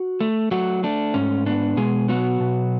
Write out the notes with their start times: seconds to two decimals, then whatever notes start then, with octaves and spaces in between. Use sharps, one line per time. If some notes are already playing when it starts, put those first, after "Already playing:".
Already playing: F#4 F#5
0.20 A3
0.51 F#3 A3 F#4
0.83 A3 D4
1.14 G#2 C#4
1.46 B3 D4
1.77 B2 G#3 G#4
2.08 F#3 B3 F#4
2.40 B2